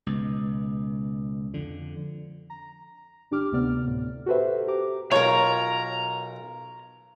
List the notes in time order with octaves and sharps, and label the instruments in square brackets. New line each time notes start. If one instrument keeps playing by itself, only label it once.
[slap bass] C#2 B2
F2 D3
[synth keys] A#5
G1 D4 G4 D6 F6
D2 C3 B3 D5 F6
A2
F#4 G4 A4 B4 C5 E5
G4 A#5 D6
[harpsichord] B1 [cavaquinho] F4 A#4 [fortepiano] C#5 [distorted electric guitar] A#5